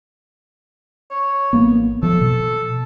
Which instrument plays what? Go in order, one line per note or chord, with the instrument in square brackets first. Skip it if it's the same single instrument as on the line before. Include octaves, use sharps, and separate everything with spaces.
[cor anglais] C#5
[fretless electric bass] A1 A#3 B3
[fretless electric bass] F3 [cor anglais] A4
[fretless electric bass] B2